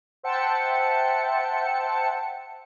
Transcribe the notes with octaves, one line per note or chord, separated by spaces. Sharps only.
C5 E5 F#5 G5 A5 C#7